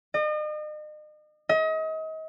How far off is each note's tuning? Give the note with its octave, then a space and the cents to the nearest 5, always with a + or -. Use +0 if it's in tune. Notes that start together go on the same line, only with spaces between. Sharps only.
D#5 -40
D#5 +35